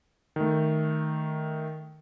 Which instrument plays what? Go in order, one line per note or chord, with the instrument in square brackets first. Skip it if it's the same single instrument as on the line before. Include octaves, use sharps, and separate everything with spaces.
[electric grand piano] D#3 A3